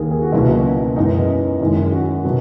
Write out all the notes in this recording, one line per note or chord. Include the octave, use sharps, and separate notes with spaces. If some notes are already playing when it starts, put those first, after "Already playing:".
Already playing: D#2 D#3 A#3 G#4 A#4
G#4
F#4
C#2 B2 F#3 A#3 C#4 E4
F#4
F#2 E3 G#3 B3 D#4
F#2 D#3 G#3 E4
F#4
B2 F#3 B3 F#4